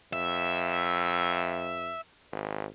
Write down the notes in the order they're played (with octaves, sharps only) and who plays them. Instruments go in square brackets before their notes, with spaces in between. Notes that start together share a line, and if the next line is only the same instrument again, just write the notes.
[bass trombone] F2 [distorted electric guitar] E5
[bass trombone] G#1